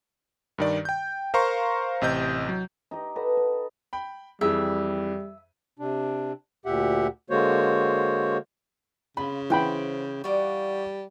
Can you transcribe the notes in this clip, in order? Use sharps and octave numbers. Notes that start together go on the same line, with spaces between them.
G2 D#3 D5
G5 G6
A#4 C5 F5 A#5 C6 C#6
A1 C3 D#5 G6
F#3
D#4 G4 D#5
A4 B4 D#5 F#5
D#5
G5 B5
F2 E3 G3 G#4 E5
C3 D4
D2 A#2 G4 E5 F#5
D3 G#3 A#3 F#4 C5 C#5
C#3 F4 B5
E3 C5 F#5 G5 B5
G3 F#4 D5 F5